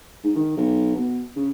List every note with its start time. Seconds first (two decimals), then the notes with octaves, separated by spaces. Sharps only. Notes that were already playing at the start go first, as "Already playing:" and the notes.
0.24 G#2
0.36 D#3
0.57 B1
0.96 B2
1.36 C#3